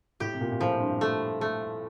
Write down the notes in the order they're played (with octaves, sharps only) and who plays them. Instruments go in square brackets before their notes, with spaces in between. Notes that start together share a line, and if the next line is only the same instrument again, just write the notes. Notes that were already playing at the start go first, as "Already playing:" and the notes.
[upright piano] A2 [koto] G4
[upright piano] C3
A#2
A#2
[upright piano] A2 [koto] F3
[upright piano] G2
[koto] A3
A3